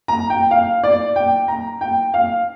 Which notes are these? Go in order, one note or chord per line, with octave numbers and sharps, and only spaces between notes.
A#5
G5
F5
D5
G5
A#5
G5
F5